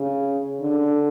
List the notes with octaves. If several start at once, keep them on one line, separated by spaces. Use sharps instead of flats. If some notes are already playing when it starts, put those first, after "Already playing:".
Already playing: C#3
D3